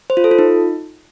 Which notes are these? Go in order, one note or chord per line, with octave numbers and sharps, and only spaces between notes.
C5
F4
A4
F4
D#4